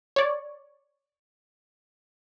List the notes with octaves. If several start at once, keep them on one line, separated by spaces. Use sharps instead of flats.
C#5 D5